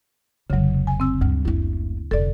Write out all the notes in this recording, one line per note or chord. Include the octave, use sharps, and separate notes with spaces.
F1 C#2 C#3 F#3
G#5
C4 E6
D2 G2
F#1 A3 E4
F1 D3 A4 D5